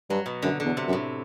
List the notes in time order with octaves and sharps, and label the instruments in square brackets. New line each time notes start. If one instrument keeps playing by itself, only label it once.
[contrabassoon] G2 [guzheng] F#3
[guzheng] B2
[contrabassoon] F#2 [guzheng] D3
[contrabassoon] E2 [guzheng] D3
[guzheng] C3
[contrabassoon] F#2
[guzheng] A2